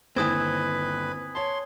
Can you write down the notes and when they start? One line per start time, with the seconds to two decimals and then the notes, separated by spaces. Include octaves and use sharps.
0.16 G1 D#2 C4 E4 B4 G#5 D#6 G#6
1.35 C#5 A5 C6